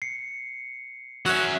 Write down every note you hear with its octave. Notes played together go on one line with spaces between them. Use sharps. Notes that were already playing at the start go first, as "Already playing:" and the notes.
C7 C#7
F#3 C#4 F#4 E5 F#5